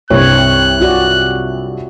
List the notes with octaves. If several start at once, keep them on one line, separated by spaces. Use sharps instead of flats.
C2 G2 C4 C#5 F#6
F4 F#4 D5